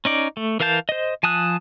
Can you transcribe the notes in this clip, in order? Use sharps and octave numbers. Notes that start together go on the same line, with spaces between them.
C#4 D#4 D5
A3
E3 A#4 F5 A5 G6
C5 D#5
F3 G#5 A5 D#6 F#6